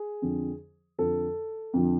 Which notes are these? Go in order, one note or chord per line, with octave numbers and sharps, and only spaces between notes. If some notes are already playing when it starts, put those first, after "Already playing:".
Already playing: G#4
F2 D3 F3
F2 D3 F3 A4
F2 D3 F3